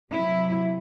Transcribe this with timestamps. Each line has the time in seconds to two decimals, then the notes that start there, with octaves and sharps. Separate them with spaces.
0.12 C3 F#3 E4